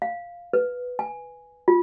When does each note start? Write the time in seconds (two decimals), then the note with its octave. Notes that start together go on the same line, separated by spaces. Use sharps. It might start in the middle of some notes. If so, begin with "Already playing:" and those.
0.02 F5
0.53 B4
0.99 G#5
1.68 F4